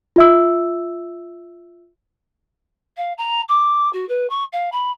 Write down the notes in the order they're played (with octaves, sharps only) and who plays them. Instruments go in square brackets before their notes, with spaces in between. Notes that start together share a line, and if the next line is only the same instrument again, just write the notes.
[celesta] F4 E5 E6
[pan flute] F5
A#5
D6
F#4
B4
C#6
F5
B5